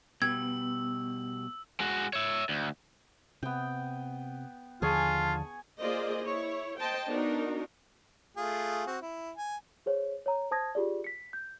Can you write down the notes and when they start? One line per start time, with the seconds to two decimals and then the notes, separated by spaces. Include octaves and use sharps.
0.22 B2 G3 B3 E6 G#6
1.80 G#3 F#4
2.13 C#5 E5
2.49 D2
3.43 C3 B3 G5
4.82 D#2 D3 F3 F4 G#4 G#5 A5 C#6
5.79 A#3 F4 G#4 C5 D5 D#5
6.23 E4 C#5
6.79 C5 D#5 G5 A5
7.10 B3 D4 D#4 F#4 A#4
8.37 A3 F4 G#4
8.86 C4 F#4
9.02 E4
9.37 G#5
9.86 G#4 C5 C#5
10.26 C#5 A#5
10.51 C5 A5 D#6 G#6 A#6
10.75 F4 G4 G#4 D5
11.04 B6 C#7
11.33 G6